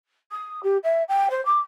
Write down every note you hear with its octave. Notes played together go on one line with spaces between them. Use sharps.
D#6
G4
E5
G5
C5
D6